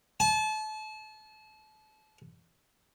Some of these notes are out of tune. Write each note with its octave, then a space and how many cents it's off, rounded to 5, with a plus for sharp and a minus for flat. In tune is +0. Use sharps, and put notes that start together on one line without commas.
A5 -30